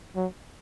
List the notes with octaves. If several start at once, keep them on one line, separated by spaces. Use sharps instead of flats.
F#3